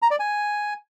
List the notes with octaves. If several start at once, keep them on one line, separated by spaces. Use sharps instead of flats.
A#5
D5
G#5